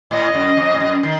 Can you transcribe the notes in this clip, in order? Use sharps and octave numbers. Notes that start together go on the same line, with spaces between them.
A2 D#5
F#2
F2
A2
F#2
D#3